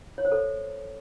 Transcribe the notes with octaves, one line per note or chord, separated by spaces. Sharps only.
C#5
C5
A4